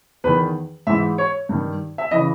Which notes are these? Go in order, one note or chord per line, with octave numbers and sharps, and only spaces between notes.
E2 D#3 B4
G#2 E3 E5
C#5
G2 D#3
E5
C#3 E3 D#5